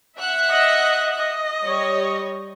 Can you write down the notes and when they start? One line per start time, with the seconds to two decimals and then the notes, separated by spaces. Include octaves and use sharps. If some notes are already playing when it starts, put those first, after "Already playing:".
0.18 E5 F#5 F#6
0.50 D#5
1.18 D#5
1.64 G3 C#5